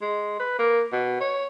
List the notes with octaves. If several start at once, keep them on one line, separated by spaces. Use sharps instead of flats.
G#3
B4
A#3
B2
C#5